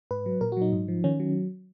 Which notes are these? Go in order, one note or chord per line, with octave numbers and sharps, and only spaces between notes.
G#2 B4
F#3
A#2 A#4
F#4
F#3 D#4
G#2
F3
D#3 C#4
F#3